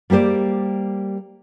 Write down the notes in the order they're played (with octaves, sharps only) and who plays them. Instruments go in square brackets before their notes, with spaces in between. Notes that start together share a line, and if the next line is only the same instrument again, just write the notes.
[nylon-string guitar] G3 A#3 G4 C5 D5